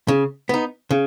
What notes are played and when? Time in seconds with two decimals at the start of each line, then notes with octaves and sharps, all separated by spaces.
0.08 C#3
0.49 B3 D#4
0.91 C#3